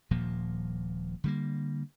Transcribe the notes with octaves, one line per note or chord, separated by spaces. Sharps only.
D#1 A#2 F3 A#3
D3 G3 A#3